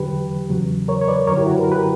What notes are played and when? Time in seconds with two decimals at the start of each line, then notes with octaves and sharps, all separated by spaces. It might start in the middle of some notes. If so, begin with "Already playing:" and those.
Already playing: E2 D3 F#3 G4 B4
0.50 E2 C#3 F#3
0.88 A#4 C#5
1.01 C#5
1.08 B4 D5
1.27 F#2 D3 F#3 A#4 C#5
1.37 E4 G4
1.47 F#4 A#4
1.56 B4
1.63 A#4
1.72 G4 B4